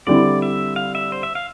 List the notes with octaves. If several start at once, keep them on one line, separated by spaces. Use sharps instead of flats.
D3 G3 C4 E4 D5
E5
F5
E5
C5
E5
F5